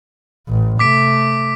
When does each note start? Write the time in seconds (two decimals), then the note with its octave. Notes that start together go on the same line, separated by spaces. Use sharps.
0.48 A1
0.79 C3 A3 D6 B6 D7